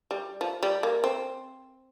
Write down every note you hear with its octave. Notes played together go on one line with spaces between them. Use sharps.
G3
F3
G3
A#3
C4